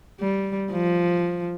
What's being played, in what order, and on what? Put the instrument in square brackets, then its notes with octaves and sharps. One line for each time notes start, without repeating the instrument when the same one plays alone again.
[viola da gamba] G3
F3